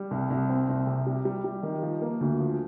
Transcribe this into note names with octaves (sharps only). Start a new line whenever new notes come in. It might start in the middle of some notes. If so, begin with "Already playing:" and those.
Already playing: G3
C2
C2
C4
C2
C3
G3
G3
G3
D#3
F3
A#3
D2
F3